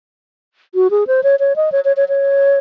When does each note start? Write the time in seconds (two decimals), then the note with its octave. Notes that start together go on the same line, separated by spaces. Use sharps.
0.75 F#4
0.91 G#4
1.07 C5
1.23 C#5
1.40 C#5
1.56 D#5
1.72 C#5
1.85 C#5
1.97 C#5
2.09 C#5